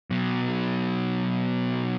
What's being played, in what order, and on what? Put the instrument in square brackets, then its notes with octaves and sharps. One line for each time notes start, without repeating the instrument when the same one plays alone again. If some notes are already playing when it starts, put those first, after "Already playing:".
[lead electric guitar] B2 F#3